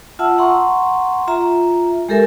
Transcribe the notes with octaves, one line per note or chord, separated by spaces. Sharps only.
F4 E5 F#5 A5 E6
F#5 A#5 C6 C#6
F4 E5 A#5
G#3 G4 A4 A#4 E5 G#5